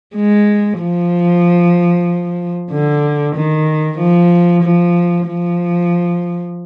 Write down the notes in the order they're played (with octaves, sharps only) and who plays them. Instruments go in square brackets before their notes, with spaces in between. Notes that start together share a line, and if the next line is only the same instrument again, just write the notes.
[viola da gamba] G#3
F3
D3
D#3
F3
F3
F3